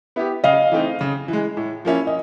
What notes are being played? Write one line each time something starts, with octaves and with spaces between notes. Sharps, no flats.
B3 E4 G4
C#3 D#5 F5
E3 A3 C4 D#4
C#3
E3
G#3
A2
F3 A#3 C#4 E4
D#5